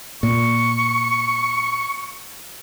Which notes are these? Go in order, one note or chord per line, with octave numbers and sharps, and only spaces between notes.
A#2 C#6